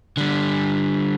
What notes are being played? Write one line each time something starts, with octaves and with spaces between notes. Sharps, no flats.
D3 G3